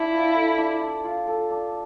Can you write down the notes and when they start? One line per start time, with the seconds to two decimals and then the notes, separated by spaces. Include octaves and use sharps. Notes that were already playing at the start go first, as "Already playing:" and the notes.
Already playing: D4 E4
0.12 F4
0.35 A4
0.57 D4
0.81 D4
1.04 F4
1.27 A4
1.50 D4